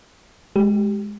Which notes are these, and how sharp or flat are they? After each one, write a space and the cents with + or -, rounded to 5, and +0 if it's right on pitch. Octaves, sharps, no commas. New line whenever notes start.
G#3 +0 G4 -15